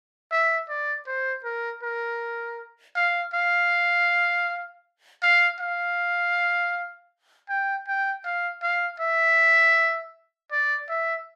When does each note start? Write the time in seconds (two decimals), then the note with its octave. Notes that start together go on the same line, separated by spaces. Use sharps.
0.31 E5
0.69 D5
1.07 C5
1.44 A#4
1.83 A#4
2.96 F5
3.34 F5
5.23 F5
5.60 F5
7.49 G5
7.87 G5
8.25 F5
8.62 F5
9.00 E5
10.52 D5
10.89 E5